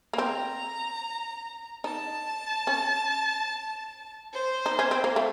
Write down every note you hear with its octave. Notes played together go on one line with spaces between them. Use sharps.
A#3
C4 A#5
D#4 A5
C#4
C5
D#4
C#4
C4
A#3
A3